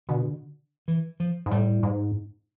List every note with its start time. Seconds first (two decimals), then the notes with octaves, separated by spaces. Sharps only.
0.09 B2 D3
0.88 E3
1.20 F3
1.46 G#2
1.51 A2 G3
1.83 G#2